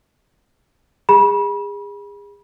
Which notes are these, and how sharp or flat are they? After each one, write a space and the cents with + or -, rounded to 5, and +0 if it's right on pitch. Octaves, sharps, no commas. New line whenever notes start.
G#4 -35 B5 -30